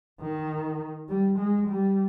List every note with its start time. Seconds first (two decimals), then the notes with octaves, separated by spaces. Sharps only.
0.20 D#3
1.09 G3
1.38 G#3
1.68 G3